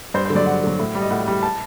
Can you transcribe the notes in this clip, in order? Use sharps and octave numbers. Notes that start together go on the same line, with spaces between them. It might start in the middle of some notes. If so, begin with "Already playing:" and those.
G2 C5
D3 C5
F#3 D5
G2 F#5
D3 F#3
A2
G3
D#5
A2 F#5
G3
A5